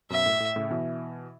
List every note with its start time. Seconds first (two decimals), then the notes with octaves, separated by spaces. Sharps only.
0.10 F#2 B2 E5
0.26 A2
0.40 A2
0.56 A2 C#3
0.70 B2 E3